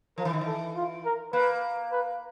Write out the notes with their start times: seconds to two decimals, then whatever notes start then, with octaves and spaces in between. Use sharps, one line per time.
0.18 F3 A#4
0.25 E3
0.33 D#3
0.41 E3
0.46 A4
0.76 F4
1.05 A#4
1.33 A#3 B4
1.92 B4